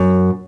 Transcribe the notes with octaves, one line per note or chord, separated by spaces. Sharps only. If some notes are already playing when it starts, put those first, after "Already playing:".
Already playing: F#2